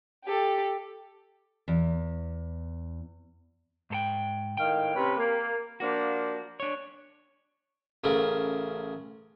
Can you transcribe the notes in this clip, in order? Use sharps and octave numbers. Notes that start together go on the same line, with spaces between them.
G4 A4
E2
G#2 A4 G5
A2 D#3 F5 G5
C3 C#4 B4
A#3
F3 A#3 D4 F#4
D4 C#5
A1 C#3 A3 A#4